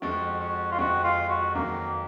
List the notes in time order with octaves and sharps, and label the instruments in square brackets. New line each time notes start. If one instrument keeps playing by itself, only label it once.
[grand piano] F2 F3 G#3 [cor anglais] F#4
[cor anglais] F#4
F4
[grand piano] F2 F3 G#3 [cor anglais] F#4
[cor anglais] F4
F#4
[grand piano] F2 D#3 F#3 [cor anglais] A#3